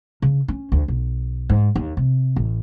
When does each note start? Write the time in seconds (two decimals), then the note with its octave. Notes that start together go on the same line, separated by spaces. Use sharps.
0.22 C#3
0.48 C#4
0.72 D2
0.88 B1
1.49 G#2
1.75 D#2
1.97 C3
2.36 A1